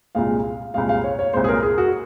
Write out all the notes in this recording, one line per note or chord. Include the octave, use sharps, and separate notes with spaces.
C2 A#2 G#3 F5
C2 A#2 G#3 F5
F5
C#5
C#5
C2 A#2 G#3 C5
G#4
A#4
G#4
F#4